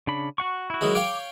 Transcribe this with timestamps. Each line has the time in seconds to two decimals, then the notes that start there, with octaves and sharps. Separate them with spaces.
0.07 C#3 D4 B5
0.38 F#4 F#5 C#6
0.70 E4 F#4
0.81 D#3 F#3 G#3
0.95 C#5 F5 G5 D6